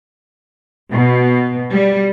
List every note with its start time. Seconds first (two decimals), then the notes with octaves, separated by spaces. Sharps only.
0.92 B2
1.72 G3